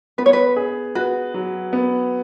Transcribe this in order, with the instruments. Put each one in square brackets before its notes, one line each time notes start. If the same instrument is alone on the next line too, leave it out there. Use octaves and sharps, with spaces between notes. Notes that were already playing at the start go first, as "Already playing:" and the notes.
[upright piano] B3 [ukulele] B4
[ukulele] C#5
B4
[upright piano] G#4
[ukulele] F#4 [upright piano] B4
[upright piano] F#3
B3